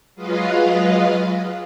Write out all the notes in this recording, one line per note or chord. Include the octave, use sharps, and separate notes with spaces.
F#3 G#3 F4 B4 D#5 F5